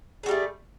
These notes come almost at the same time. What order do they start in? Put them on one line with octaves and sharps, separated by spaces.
G#4 F#4 G3 A3